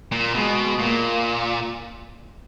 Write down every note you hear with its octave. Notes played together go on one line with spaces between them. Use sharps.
A#2
B2 G#3
A#2 A#3